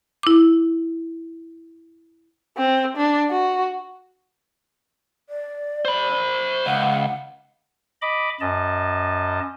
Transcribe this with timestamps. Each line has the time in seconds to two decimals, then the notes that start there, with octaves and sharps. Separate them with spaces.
0.23 E4 D6
2.58 C4
2.97 D4
3.31 F#4
5.29 D5
5.85 C5 B5
6.66 C#2 F#5
8.02 D#5 B5 D6
8.40 F#2 D#5 A5